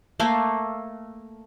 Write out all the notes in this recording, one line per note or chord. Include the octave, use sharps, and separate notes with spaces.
A3 A#3 A4 F5